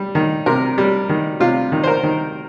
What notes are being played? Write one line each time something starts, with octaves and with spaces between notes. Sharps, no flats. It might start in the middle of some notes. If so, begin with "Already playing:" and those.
Already playing: G3
D#3
C3 A#4
G3
D#3
C3 F4
D#3
C5
A#4
D#3